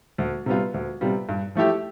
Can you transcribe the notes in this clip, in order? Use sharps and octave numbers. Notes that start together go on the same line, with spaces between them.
D2
C3 G3 B3 F4
D2
C3 G3 B3 F4
G2
F3 A3 E4 G4